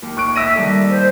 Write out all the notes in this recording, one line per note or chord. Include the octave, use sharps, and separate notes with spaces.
D#2
C#6 F#6 D7
E5 E6 A#6 D#7
D#3 G3 A4
C5